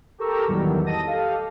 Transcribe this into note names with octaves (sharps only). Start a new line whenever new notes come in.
G4 A4 A#4 A#5 C#6 E6
E2 A2 D#3 F#3 G3
D#5 A5 A#6 D#7
G4 A4 F5